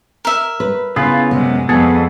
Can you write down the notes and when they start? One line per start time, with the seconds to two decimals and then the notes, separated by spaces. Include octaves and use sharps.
0.25 A#4 E5
0.60 B4
0.96 C#3 B3 E4 F4
1.31 F#2 C3 G#3 B3
1.69 F2 B3 G#4 A4